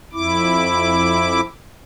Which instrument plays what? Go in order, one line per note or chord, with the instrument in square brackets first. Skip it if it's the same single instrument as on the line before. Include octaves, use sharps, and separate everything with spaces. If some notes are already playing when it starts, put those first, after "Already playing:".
[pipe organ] F2 E4 D6